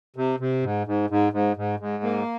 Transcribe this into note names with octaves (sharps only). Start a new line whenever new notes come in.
C3
C3
G#2
G#2
G#2
G#2
G#2
G#2
A#3